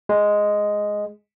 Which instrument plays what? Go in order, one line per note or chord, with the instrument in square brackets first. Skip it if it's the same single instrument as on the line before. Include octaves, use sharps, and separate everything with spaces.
[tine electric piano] G#3